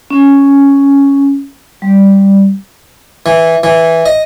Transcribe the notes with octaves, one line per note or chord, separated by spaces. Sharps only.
C#4
G3
E3
E3
D#5